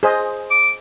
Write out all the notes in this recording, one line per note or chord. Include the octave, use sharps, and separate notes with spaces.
G#4 C5 D#5
D6